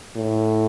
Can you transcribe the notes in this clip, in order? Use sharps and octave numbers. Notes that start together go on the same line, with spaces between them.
A2